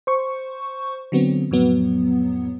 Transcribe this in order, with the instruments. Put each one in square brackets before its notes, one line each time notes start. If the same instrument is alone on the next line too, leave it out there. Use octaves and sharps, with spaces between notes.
[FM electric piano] C5 C#6
D3 F#3 B3 C4
F2 A2 F#3 B3